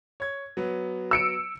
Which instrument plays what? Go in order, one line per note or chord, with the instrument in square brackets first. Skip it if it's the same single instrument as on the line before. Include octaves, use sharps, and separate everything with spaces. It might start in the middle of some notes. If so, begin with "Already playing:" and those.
[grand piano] C#5 G#6
F#3 B3
[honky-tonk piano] E6 C#7 D7